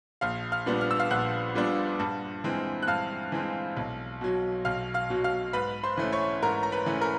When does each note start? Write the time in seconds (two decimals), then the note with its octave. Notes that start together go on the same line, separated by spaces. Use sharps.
0.21 A#1 F5 F6
0.52 F5 F6
0.66 A#2 G3 B3 D4
0.81 F6
0.91 E6
1.00 F5 F6
1.10 A#1 F#5 F#6
1.55 A#2 G3 B3 D4
1.99 G2
2.44 E3 G#3 C4
2.82 F#6
2.87 G2 F5 F6
3.32 E3 G#3 C4
3.77 B1
4.21 B2 F#3
4.65 B1 F5 F6
4.94 F5 F6
5.10 B2 F#3
5.24 F5 F6
5.53 G#2 B4 B5
5.84 C5 C6
5.97 E3 A3 C#4
6.13 C#5 C#6
6.42 G#2 A#4 A#5
6.63 A#5
6.72 B4 B5
6.86 E3 A3 C#4
7.01 A#4 A#5